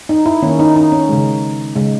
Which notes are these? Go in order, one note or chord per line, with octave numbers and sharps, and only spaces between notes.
D#4
E4
D#3 A#3 C#4
D#4
D#4
C#4
C#3 G#3
C#3 G#3